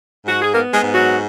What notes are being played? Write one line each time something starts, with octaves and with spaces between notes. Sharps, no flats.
G#2 F#4
G#4
A#3 B3 A#4
G#3 G#4
G#2
F#3 F#4